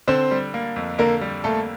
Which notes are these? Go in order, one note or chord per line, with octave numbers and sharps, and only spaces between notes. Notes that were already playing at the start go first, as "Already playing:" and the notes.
D3 C4 C5
G3
A#3
F2
D3 A#3 A#4
G3
A3 A#3 A4